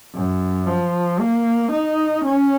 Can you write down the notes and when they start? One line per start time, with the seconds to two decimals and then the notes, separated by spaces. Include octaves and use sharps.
0.15 F#2
0.67 F3
1.20 A#3
1.71 D#4
2.24 C#4